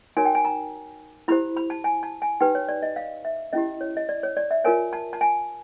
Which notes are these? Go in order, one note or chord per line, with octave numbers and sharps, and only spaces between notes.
D#4 F#4 A#4 C#5 G#5
G5
G#5
A#5
E4 G4 C5 B5
B5
A5
G#5
A5
G#5
D#4 G4 B4 G5
C#5
D5
D#5
F5
E5
C#4 E4 G4 D#5
C#5
D#5
D5
C#5
D5
E5
F4 A#4 C#5 G#5
A5
A5
G#5